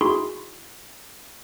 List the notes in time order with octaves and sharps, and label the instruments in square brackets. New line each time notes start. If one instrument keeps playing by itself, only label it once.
[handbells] D#4 E4 F#4 G#4 B5 C6